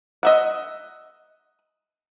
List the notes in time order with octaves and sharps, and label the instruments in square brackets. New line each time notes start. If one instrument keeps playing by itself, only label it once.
[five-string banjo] D#5 E5 F#5